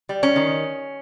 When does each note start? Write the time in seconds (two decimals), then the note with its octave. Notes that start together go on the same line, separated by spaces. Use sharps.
0.09 G3
0.23 C#4
0.36 D#3